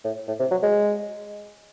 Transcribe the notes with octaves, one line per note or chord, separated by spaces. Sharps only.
A2
A2
C3
F#3
G#3